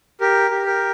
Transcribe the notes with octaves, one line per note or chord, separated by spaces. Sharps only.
G4 A#4
G4
A#4